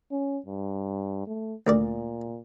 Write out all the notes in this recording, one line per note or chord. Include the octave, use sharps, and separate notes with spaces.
C#4
G2
A3
D2 A#2 A#4 D5